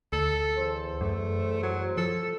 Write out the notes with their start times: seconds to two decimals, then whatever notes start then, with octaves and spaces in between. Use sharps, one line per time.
0.13 D2 A4
0.57 E2 C5
1.01 F#2 A3
1.62 F#3
1.97 F3 A4